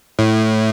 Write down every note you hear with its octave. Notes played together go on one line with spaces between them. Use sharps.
A2